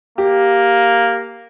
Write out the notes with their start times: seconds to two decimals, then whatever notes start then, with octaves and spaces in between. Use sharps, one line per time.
0.18 A#3 G4